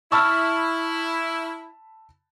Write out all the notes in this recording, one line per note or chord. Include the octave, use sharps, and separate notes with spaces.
E4 A5 B5 C#6 E6 F6